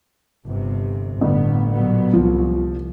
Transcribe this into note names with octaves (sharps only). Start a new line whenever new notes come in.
G1 C3
G1 A2 B3
A#2 F#3 B3
C2 F3